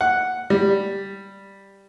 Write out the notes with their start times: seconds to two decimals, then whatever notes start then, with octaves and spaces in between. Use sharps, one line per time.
0.01 F#5
0.50 G3